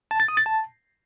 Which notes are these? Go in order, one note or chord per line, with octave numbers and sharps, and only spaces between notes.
A5
A6
D#6
A6
A5